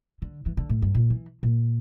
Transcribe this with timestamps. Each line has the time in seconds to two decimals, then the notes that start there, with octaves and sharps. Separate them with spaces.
0.22 D3
0.46 E3
0.57 D3
0.69 A2
0.82 G2
0.95 A#2
1.10 E3
1.43 A#2